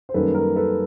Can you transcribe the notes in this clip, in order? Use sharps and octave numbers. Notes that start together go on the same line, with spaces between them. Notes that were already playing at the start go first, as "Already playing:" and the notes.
C5
F#2 D#3 G3 A#3 A4 B4
A#4
A4 B4